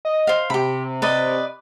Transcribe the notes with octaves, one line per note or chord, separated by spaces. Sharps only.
D#5
C5 F5
C3 G4 B5
B4 D5 D#5